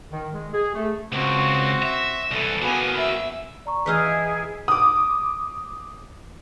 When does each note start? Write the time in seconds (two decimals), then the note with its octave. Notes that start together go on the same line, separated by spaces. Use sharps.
0.11 D#3
0.33 G#3
0.53 G#4
0.74 A3
1.12 C#2 C4 F#4
1.82 E5
2.31 C2 E3 A4
2.62 F#3 A#3 B3 G#5
2.98 E5
3.66 D5 A#5 C#6
3.86 E3 D#4 E4 G#4 F5 E6 F6 B6
4.68 D6 D#6